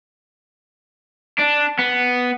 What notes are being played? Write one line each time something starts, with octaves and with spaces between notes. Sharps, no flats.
D4
B3